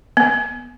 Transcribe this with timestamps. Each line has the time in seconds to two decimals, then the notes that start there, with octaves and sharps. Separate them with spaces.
0.17 B3